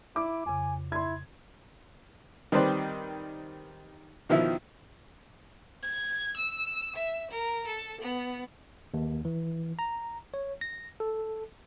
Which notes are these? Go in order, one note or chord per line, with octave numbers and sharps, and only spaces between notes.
E4 D6
F2 C#3 G#5
E4 C6 G#6
D#3 G3 C4 B4 C5 D5
B2 D#3 F3 E4 E5
G#6
E6
E5
A#4
A4
B3
D#2
E3
A#5
C#5
A#6
A4